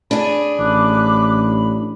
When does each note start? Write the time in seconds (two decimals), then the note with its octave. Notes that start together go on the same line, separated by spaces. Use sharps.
0.11 D4 G#4 B5
0.59 A1 D6 F#6